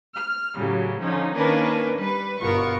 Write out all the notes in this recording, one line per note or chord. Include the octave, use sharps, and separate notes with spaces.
F6
A2 C#3 F#3 G3
D3 F3 C#4 D#4
D#3 A#3 C#4 D4 A#4 B4
G3 B4
G1 B2 B3 F4 A#4 C#6